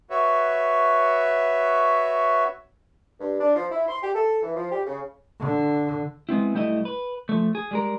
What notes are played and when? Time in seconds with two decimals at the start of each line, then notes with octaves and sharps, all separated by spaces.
0.10 F#4 B4 C#5 E5
3.21 G2
3.41 D4
3.55 F3
3.71 E4
3.88 C6
4.03 G4
4.15 A4
4.43 E3
4.56 F3
4.72 G4
4.87 C#3
5.39 D3
6.29 G#3 B3 C4 E4
6.54 B1 G3 A3 E4 D#5
6.85 B4
7.29 F3 A3
7.55 G#4
7.71 G3 G#3 A#4